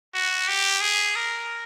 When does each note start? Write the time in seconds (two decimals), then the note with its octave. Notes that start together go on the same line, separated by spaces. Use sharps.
0.14 F#4
0.48 G4
0.81 G#4
1.16 A#4